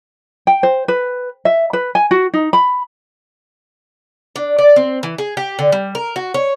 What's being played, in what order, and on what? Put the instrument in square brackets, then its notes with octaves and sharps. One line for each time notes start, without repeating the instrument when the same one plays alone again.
[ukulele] G5
C5
B4
E5
B4
G#5
F#4
D#4
B5
[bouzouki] D4
D5
C4
E3
G#4
G4
D3
G3
A#4
F#4
C#5